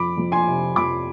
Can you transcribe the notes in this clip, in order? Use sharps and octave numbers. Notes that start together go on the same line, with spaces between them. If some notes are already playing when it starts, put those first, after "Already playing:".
Already playing: F2 B5 D6
F2
G#5 C6
C3
F2 B5 D6